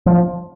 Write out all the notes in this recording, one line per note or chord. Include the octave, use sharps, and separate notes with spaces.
F3